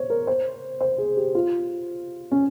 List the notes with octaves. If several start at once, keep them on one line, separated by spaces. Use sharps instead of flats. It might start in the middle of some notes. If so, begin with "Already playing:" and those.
Already playing: C5 C#5
A#4
C5
C5
G#4
G4
F4
C#4